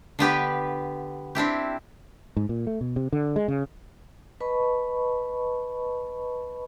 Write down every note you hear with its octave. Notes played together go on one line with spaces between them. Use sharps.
D3 B3 G4 B4
C4 D4 E4 G4
G#2
A#2
A3
B2
C3
D3
G#3
C#3
B4 D#5 A5 B5 C#6